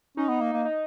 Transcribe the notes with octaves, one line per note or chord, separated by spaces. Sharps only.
C#4 D#4
B3
A#3
A#3
D#4